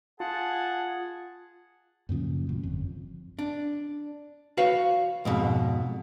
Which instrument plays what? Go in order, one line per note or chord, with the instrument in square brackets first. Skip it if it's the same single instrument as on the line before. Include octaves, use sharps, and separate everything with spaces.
[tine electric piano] F4 [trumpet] G#4 [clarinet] F#5 [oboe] A5
[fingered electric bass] F#2 A#2 C#3 F3
A1 F#2
G1 F2
[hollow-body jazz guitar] D4
F#4 B4 C#5 F5
F2 G#2 B2